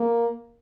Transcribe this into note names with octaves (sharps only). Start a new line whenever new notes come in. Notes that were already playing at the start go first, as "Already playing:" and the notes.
Already playing: A#3